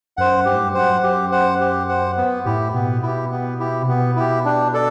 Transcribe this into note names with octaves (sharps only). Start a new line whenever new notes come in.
F#2 C5 F#5
G2 G4
A2
G2
F#2 C5 F#5
F#2 G4
C5 F#5
G4
C5 F#5
B3
A2 E4 G4
B2 B3
E4 G4
B3
E4 G4
C3
B2 B3
E4 G4
D4
A4 D5